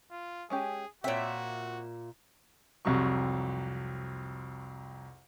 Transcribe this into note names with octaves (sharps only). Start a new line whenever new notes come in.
F4
G#3 C#4 G4 G#4
A#2 C4 F#4 C#5 E5
C2 F2 C3 F#3 C#6